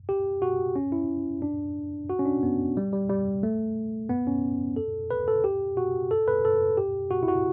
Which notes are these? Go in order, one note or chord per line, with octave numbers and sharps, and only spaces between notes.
G4
F#4
C#4
E4
D4
F#4
C#4
D4
B3
G3
G3
G3
A3
B3
C#4
A4
B4
A4
G4
F#4
A4
B4
A4
G4
F#4
E4
F#4